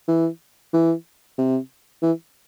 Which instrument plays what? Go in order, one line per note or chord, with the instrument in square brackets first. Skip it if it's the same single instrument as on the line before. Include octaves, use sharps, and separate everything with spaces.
[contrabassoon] E3
E3
C3
E3